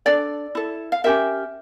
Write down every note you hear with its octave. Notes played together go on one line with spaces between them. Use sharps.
D4 A4 D5
E4 A4
F5
C#4 G4 A#4 E5